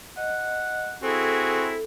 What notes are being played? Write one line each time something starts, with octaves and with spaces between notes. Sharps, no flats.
D#5 F#5
C4 E4 F#4 G#4 A4